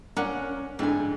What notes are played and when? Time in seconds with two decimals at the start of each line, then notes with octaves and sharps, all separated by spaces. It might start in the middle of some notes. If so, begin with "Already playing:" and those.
0.17 C#4 A#4 D5 F#5
0.79 F2 G#2 D3 G#5